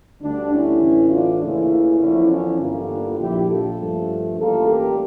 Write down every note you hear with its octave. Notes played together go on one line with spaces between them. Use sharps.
D2 D3 G3 D4
C#4 E4
A1 A2 E3
D4 F4
D2 C#3 E3 A#3 C#4 E4
E2 D3 F3 C#4 E4
C#4 E4
G1 G2 D3 G3 A#3 D4 F4
A#1 A#2 F3 E4 G4
F4 A4
G2 F3 A3
A1 A2 G3 A#3 F4 A4
G4 A#4